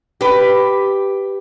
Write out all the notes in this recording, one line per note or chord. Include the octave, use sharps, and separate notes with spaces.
G4 B4